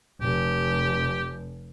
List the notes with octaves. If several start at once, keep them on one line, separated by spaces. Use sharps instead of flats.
F1 G4